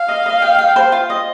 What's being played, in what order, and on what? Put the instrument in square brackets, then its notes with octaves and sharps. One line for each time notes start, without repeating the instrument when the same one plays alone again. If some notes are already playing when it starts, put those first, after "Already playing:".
Already playing: [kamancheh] F5
[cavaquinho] D#5
D#5
G5
G5
C5
F4
D#5